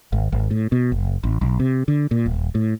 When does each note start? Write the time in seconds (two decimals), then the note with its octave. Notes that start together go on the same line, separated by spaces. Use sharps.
0.13 G#1
0.32 G#1
0.51 A2
0.72 B2
0.92 F#1
1.24 A1
1.41 B1
1.60 C3
1.88 D3
2.11 A#2
2.26 D#1
2.55 A2